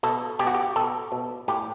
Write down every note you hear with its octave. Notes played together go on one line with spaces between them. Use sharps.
B2 A4
B2 G4
F#4
G4
B2 A4
B2
A2 G4